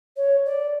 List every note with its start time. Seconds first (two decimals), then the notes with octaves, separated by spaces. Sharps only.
0.16 C#5
0.45 D5